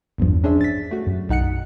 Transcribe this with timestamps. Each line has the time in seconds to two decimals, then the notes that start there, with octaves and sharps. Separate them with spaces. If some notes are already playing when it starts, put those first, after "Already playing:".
0.18 A1 E2 G2 F3
0.44 C#4 D4 G#4 C5 E5
0.61 A6 B6
0.91 A3 F#4
1.07 F#2
1.29 B1 D#4 F#5 F#6 C#7